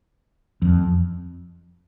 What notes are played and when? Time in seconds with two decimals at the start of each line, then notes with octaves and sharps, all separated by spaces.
0.62 F2